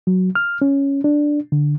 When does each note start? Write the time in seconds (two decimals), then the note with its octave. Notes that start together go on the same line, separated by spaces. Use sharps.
0.07 F#3
0.35 F6
0.62 C#4
1.04 D4
1.52 D3